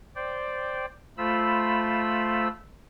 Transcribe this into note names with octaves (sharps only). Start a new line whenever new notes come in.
C5 D5 G5
A3 F4 C5 B5 E6